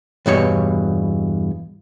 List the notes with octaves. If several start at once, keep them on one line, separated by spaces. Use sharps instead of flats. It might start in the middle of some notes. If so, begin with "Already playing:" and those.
E2 G2 B2 C#5